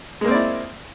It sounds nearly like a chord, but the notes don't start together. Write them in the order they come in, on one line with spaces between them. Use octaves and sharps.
G#3 A#3 C4 D5 E4